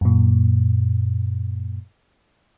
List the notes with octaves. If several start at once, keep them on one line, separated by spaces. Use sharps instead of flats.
F#2 A#2